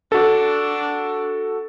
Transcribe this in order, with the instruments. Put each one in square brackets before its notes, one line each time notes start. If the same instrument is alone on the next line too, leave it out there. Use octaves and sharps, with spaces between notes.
[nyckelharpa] D4 [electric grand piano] F#4 A4